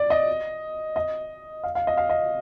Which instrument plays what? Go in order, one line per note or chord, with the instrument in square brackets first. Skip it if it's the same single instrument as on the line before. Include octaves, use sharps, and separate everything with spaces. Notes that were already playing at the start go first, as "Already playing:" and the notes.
Already playing: [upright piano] D5
D#5
D#5
F5
F5
D#5
F5
D#5